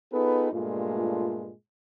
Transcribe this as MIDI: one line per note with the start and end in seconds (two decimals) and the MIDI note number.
0.13 0.51 59
0.13 0.51 63
0.13 0.51 65
0.13 0.51 68
0.13 0.51 69
0.13 0.51 71
0.53 1.53 43
0.53 1.53 46
0.53 1.53 56
0.53 1.53 57
0.53 1.53 65